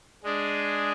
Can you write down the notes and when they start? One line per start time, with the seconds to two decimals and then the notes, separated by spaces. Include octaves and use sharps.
0.24 G#3 D4 G#4